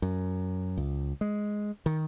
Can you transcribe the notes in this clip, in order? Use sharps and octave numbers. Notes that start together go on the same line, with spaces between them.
F#2
C#2
G#3
D#3